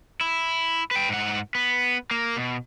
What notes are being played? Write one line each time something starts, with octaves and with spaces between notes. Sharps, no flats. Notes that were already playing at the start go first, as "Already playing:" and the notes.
E4
B4 G5
G#2 F#5
B3
A#3
B2